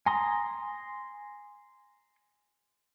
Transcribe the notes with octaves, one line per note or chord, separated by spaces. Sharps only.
G#5 A#5 C6 D#6